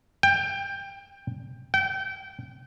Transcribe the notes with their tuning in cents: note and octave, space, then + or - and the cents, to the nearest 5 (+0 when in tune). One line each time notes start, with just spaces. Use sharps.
G5 +15
G5 -30